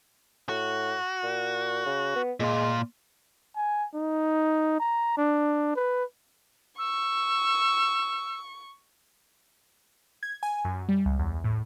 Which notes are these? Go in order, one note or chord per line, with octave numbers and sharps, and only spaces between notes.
A2 F#4
A#2
C#3
B3
A#2 G#3 F4
G#5
D#4
A#5
D4
B4
C#6 E6
G#6
G#5
F#2
G3
C#2
E2
A2